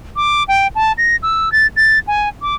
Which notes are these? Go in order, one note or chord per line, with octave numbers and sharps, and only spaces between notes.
D6
G5
A5
A#6
E6
A6
A6
G#5
D6